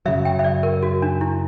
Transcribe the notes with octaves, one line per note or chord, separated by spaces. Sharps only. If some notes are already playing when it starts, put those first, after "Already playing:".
F#2 C#3 F#3 E5
G5
E5
D5
A#4
F#4
D4
E4